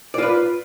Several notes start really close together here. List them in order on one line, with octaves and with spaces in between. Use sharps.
D5 F4 B4